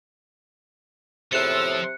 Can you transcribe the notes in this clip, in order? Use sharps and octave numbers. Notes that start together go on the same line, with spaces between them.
E2 A2 C3 F3 E6 F#6 C#7